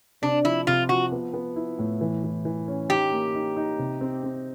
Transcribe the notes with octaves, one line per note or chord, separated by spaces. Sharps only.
C3 D4
F3 E4
C3 F4
F3 F#4
B3
B3
E4
A2
E3
E3
E3
C#4
D#4 G4
A#3
D#4
D#4
C3
C4
C4